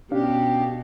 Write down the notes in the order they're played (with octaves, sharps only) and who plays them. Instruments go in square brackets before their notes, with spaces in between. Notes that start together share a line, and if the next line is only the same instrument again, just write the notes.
[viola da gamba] B2 [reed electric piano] C#4 D4 F5 [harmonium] G4